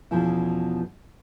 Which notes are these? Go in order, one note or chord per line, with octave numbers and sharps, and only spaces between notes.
E2 B2 F3 C#4 E4